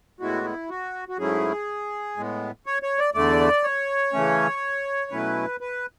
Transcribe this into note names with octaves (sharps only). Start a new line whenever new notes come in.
A2 G#3 B3 E4 F#4
E4
F#4
F#4
G#2 F#3 A3 C#4 E4 G#4
A2 G#3 B3
C#5
C#5
D5
E2 D3 A3 D5
C#5
C#3 E3 A3 C#4
B2 F#3 A3 C#4 E4 B4
B4